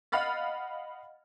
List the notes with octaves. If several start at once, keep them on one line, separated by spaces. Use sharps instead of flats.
D#5 F5 F#5 B5 F6 A6